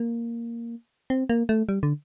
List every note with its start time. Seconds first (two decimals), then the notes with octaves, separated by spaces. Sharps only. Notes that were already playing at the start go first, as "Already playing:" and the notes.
Already playing: A#3
1.10 C4
1.30 A#3
1.49 A3
1.69 G3
1.83 D3